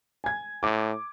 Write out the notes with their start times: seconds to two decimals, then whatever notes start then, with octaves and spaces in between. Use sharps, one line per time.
0.24 G#5 G#6
0.63 A2 D6